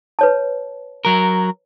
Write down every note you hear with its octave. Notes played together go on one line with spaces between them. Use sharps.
B4 C#5 A5
F#3 A#4